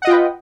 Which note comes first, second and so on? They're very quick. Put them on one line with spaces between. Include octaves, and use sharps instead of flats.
F#5 D#5 F4 G5 B4